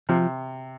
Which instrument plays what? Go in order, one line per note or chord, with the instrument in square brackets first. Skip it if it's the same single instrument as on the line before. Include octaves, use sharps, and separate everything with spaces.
[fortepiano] C3 [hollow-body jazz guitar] F3